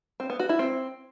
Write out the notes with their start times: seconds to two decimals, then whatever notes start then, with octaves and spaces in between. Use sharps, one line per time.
0.20 C4
0.30 B3
0.39 F#4
0.49 E4
0.59 C4